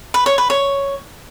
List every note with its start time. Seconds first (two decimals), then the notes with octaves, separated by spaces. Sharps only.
0.14 B4
0.26 C#5
0.38 B4
0.50 C#5